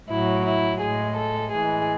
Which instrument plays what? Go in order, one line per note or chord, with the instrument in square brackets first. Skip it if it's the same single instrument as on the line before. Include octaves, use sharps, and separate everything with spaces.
[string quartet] A2 F#3 E4
E4
A2 G#3 G#4
A4
A2 E3 G#3 G#4